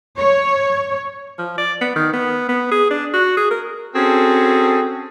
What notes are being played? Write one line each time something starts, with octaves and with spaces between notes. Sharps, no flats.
C#5
F3
D5
B3
D#3
B3
B3
G#4
D4
F#4
G#4
A#4
C4 C#4 F#4 G#4 A4